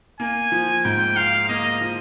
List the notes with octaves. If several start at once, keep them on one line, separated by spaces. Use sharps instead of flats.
A#3 G#5
F3
G#2 G5
F4 F5
A#3 D#5
F3